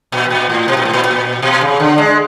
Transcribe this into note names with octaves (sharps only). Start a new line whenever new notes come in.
A#2
A#2
A2
B2
A#2
A2
A#2
A#2
B2
C#3
D3
G#3